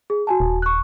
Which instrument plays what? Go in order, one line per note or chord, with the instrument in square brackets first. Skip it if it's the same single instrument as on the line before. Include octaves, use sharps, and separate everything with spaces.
[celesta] G#4
F#4 G#5 A5
[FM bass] D#1
[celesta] C#6 F#6